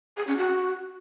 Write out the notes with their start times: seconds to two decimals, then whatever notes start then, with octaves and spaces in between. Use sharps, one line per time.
0.17 G#4
0.27 C#4
0.37 F#4